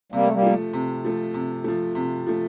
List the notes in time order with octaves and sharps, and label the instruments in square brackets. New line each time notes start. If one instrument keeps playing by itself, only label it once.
[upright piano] C3 [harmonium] G3 A#3
[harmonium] A3
G3 A#3
[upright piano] F3 A3
C3
F3 A3
C3
F3 A3
C3
F3 A3